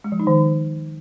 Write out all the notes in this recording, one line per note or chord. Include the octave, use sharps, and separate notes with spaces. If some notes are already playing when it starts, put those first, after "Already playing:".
G#3
F3
D#4
D#3